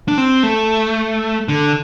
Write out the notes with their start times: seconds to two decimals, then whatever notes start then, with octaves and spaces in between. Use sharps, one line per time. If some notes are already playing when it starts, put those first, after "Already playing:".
0.08 D4
0.18 C4
0.43 A3
1.48 D3